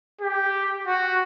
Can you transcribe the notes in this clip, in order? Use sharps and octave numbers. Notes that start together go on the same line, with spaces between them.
G4
F#4